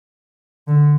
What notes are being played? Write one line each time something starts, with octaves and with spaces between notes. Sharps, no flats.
D3